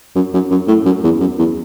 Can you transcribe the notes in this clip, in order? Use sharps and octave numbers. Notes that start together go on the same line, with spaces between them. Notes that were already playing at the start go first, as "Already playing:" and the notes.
F#2
F#2
F#2
A2
F#2
E2
F#2
E2